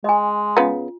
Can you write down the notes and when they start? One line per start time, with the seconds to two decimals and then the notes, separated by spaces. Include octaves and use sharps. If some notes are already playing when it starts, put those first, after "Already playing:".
0.04 G#3 D#5 G#5
0.57 C#3 B3 F4